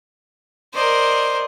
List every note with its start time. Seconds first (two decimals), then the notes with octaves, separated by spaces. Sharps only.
0.74 A#4 C5 D5 D#5